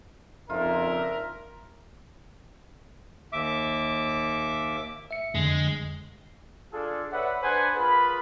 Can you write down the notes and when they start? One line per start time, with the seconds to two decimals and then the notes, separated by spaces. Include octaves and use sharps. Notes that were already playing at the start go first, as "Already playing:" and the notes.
0.50 F2 C#3 D4 D#4 F4 A#4 E5
3.33 D#2 E5 D6
5.11 E5 C#7
5.35 F2 D3 G#3
6.73 D4 F4 G#4 A4
7.11 B4 C#5 D5 E5 F#5
7.43 D4 G#4 B4 C5 F#5 G#5
7.76 F4 G#4 A#4 B4 B5